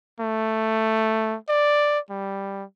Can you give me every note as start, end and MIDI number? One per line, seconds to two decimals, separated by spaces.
0.20 1.37 57
1.49 1.99 74
2.10 2.64 55